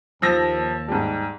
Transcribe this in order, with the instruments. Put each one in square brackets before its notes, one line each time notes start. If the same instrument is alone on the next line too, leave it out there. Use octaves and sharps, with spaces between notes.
[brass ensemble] D#2 A5 [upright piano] F3 E6 A#6
[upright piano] G#2 G3